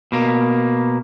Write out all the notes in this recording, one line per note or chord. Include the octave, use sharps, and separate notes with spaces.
B2 A#3